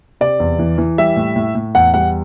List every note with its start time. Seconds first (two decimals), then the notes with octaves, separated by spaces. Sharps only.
0.21 C3 D5
0.40 E2
0.59 E3
0.78 E3
0.98 G3 E5
1.16 A2
1.36 A2
1.55 A2
1.75 E2 F#5
1.94 G3 F#5